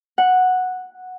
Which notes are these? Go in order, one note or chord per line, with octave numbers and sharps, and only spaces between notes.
F#5